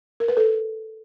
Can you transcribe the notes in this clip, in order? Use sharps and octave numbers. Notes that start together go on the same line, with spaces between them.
A#4
B4
A4